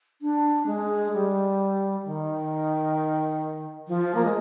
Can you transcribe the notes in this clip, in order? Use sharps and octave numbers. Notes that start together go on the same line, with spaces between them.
D4
G#3
G3
D#3
F3
A#3
G#3